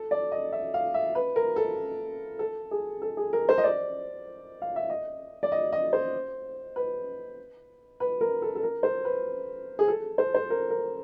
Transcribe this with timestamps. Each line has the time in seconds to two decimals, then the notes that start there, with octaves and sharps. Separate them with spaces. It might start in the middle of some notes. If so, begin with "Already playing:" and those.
Already playing: A4
0.11 D5
0.32 D#5
0.52 E5
0.74 F5
0.94 E5
1.15 B4
1.36 A#4
1.56 A4
2.39 A4
2.71 G#4
3.02 A4
3.17 G#4
3.33 A#4
3.49 C5
3.58 D#5
3.64 D5
4.62 F5
4.76 E5
4.90 D#5
5.43 D5
5.52 D#5
5.72 D#5
5.93 C5
6.76 B4
8.00 B4
8.21 A#4
8.42 A4
8.55 A4
8.63 A#4
8.83 C5
9.05 B4
9.79 G#4
9.88 A4
10.18 C5
10.35 C5
10.50 A#4
10.70 A#4